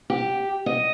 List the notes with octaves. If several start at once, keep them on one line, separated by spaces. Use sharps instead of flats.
G4
D#5